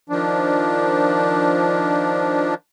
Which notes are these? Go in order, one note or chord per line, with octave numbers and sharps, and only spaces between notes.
D#3 F3 D4